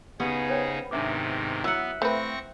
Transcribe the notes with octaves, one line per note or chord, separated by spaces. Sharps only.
C#3 B3 D#4 G4 G#4 B4
C5 C#5 G5
G#2 C3 D#3 D4 E5 D6
F#3 B3 E4 E5 F#5 A#5 E6
A3 C4 B4 C5 F5 G5 C#6 A#6